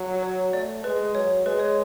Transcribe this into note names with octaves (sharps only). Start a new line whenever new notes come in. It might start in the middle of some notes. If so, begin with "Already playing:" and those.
Already playing: F#3
C#5
A3 D5
G#3 B4
F#3 C#5
G#3 B4
C#5